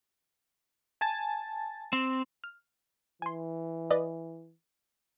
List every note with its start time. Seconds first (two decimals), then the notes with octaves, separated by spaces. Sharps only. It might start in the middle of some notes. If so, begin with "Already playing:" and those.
1.01 G#5 A5 A6
1.93 C4
2.44 F6
3.22 E3 G#5 C6
3.91 B4 D5 D#5